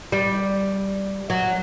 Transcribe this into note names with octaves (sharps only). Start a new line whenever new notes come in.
G3
F#3